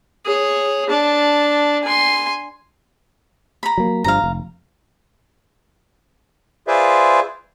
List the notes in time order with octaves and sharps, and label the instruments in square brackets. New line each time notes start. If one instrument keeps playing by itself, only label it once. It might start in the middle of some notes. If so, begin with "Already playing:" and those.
[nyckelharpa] G#4 C#5
D4 A5
G#5 C6
[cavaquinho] A#5 B5
[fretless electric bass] F#3 A#3
[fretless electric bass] G1 G2 F3 [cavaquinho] F5 A#5
[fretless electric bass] F1
[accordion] F4 G#4 B4 C5 D5 E5